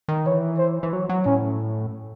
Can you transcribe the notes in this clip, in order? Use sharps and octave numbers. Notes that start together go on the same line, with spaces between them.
D#3
E3 C#5
C5
E3
F#3
F#3
A2 C#4